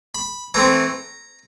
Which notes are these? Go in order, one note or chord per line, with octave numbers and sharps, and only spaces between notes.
B5
E3 A3 C4 A#5